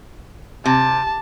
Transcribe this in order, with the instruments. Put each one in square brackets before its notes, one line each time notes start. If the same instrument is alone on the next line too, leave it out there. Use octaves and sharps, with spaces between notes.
[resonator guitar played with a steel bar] C3 [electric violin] A5